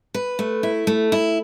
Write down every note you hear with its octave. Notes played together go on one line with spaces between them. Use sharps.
B4
A3
E4
A3
E4